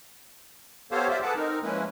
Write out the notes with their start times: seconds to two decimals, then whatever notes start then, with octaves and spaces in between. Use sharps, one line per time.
0.91 B3 G4 A4 C5 C#5 F5
1.09 F4 G4 C5 D5 E5 F5
1.22 G#4 A4 B4 F#5 A5 D6
1.36 C4 D#4 A#4
1.63 F3 G#3 A#3 C#4 E4 B4